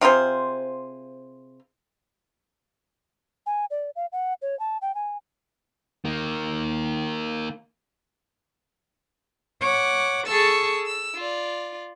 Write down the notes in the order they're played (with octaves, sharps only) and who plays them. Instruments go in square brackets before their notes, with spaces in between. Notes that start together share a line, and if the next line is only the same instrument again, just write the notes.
[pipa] C3 F4 G#4 C5
[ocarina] G#5
D5
F5
F#5
C#5
A5
G5
G#5
[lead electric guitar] D#3 A#3
[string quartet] C#5 F#5 D6
G#4 A4 A5 C#6 E6
E6
F4 D5